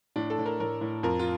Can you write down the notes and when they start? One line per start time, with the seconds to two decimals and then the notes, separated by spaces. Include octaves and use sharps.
0.16 A2 D4
0.30 A4
0.38 A2
0.46 A#4
0.60 A2 A#4
0.81 A2
1.03 F2 A#4
1.19 F4